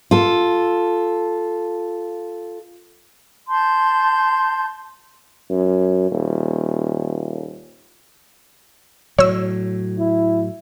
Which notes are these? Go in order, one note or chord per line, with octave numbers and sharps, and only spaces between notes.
F4 A4
A5 C6 G6
F#2
D#1
A2 F#3 C#5 E6
E4